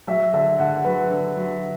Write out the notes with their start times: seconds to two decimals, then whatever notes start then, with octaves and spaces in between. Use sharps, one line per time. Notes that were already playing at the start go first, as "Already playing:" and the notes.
0.07 F#3 E5
0.33 D3 E5
0.59 D3 F#5
0.85 F#3 B4
1.11 D3
1.37 F#3